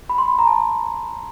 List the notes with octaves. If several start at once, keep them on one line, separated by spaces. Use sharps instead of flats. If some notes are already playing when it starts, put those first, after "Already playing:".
B5
C6
B5
A#5
A5